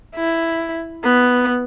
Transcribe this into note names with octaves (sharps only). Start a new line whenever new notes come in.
E4
B3